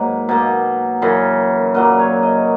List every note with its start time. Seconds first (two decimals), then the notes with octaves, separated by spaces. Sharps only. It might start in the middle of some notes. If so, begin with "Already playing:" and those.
Already playing: G#2 F#3 A#3 B4
0.29 B2 A#3
1.02 F#2 C#3 E3
1.74 A#2 F#3 A#3 B4
1.99 C#5
2.23 D#5